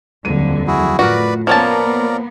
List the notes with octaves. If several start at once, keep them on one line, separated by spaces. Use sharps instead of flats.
D#1 F2 D3 F#3 D#7
E4 F#4 G#4
A2 F4 F#4 A#4 B4 D5 B5
F3 A#3 B3 C#4 A#4 D5 A5